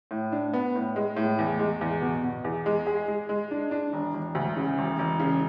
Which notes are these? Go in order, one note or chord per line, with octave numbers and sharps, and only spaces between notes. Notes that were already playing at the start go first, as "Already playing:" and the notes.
A2
D4
B3
A2
G#3
A2
E2
G#3
E2
B2
B2
E2
G#3
G#4
G#3
G#3
D4
D4
E1
E1
D2
C#3
E1
E1
C#3